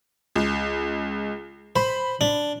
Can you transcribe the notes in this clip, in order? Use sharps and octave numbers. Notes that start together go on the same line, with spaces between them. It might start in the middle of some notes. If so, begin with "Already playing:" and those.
C#2
C5 B5
D4